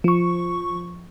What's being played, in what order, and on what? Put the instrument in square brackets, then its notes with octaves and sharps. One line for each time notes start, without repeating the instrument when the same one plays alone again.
[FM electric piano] F3 C#6